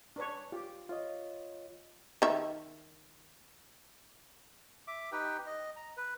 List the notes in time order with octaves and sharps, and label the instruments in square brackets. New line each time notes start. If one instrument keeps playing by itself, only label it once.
[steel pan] D4 B4 C#5
[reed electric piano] F4 [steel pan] G4
[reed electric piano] F4 C#5 D#5
[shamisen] D#3 E5
[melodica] E5 D6
D#4 G4 B4 G5
D#5
A#5
B4